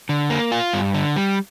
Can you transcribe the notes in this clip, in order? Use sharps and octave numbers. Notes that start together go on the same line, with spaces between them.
D3
A#3
F4
G2
D3
G3